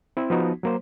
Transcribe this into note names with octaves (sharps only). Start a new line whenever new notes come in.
C4 E4
F3 B3 D#4 F#4
F#3 A#3 C5